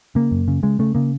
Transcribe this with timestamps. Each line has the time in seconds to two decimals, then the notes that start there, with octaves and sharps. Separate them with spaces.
0.15 C#3 A#3
0.31 F#2
0.48 C#3
0.63 C#3 G#3
0.79 C#3 A3
0.95 C#3 A#3